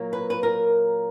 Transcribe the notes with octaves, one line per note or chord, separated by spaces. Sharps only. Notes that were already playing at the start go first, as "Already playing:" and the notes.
Already playing: A#2 F#3 A#3
B4
B4
A#4